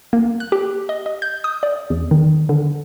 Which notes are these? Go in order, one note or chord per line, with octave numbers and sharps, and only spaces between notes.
A#3
F#6
G4
D#5
D#5
G6
D#6
D5
E2
D#3
D3